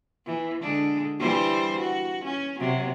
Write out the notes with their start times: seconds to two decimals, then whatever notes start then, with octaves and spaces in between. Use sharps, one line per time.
0.26 E3
0.62 D3 G#3 D4
1.19 E3 G3 C5
1.80 F#4
2.25 C#4
2.60 C3 F#3